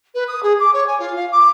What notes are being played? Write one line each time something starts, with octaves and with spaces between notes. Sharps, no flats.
B4
D#6
G#4
D6
C#5
G#5
F4
F5
D6